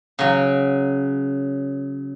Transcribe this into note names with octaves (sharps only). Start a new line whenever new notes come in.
C#3 F#3